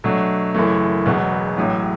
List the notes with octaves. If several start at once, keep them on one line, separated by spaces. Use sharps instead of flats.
B2 F#3 A3 D4
F#1 F#2 E3 A3
E1 E2 B2 F#3 B3
A1 A2 F#3